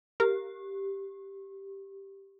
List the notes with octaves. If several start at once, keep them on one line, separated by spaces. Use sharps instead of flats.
G4 A#4